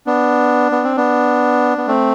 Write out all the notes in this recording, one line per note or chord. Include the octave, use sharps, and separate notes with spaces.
B3 D4
B3
C4
B3 D4
B3
A3 C4